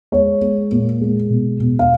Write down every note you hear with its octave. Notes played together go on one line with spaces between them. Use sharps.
G#3 C#5
G#3
A#2
G#3
B2
B2
F5